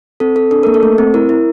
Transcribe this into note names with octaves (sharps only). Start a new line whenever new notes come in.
C4 A4
C4 A4
D4 A4
A#3 A#4
A4
A3
C4
E4 A#4
E4